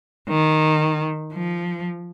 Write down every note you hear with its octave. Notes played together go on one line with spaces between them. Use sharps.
D#3
F3